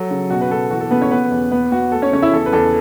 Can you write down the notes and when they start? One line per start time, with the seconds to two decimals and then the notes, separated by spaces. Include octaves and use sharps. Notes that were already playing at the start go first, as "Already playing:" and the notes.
Already playing: F#3 A4
0.11 C#3
0.30 B2 F#4
0.41 B4
0.51 B2 A4
0.70 E3 F#4
0.80 A4
0.91 C#3 B3 B4
1.01 C#4 C#5
1.11 B3 B4
1.31 E2
1.51 B3 B4
1.72 B3 F#4
1.92 A3 A4
2.02 C#4 C#5
2.13 C#3 C#4 C#5
2.22 E4 E5
2.33 E2 A4
2.46 B4
2.53 E2 A4